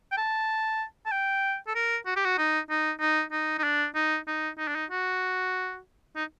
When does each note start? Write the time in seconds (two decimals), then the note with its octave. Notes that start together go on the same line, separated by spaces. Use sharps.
0.12 G5
0.17 A5
1.06 A5
1.12 G5
1.67 A4
1.75 A#4
2.06 F#4
2.16 G4
2.25 F#4
2.38 D#4
2.70 D#4
3.00 D#4
3.32 D#4
3.59 D#4
3.64 D4
3.95 D#4
4.27 D#4
4.58 D#4
4.68 D4
4.76 D#4
4.91 F#4
6.16 D#4